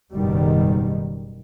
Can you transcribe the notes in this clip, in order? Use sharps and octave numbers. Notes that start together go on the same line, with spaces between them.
F#1 G#2 B2 D#3 G3